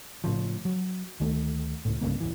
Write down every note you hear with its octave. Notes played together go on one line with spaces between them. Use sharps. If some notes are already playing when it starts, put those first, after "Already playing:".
A2 C#3 F3
F#3
D2 D#3 A3
C#2 A2
C2 G2 C#3 A#3
D#1 E3